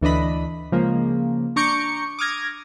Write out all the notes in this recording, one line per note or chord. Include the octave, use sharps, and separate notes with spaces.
D2 E3 D4 D#5 B5
C#3 F3 G#3 A#3
D4 A#5 C#6 D6 G6 C#7
D6 D#6 F6 G#6 A#6